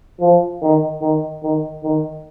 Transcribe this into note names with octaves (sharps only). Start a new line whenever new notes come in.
F3
D#3
D#3
D#3
D#3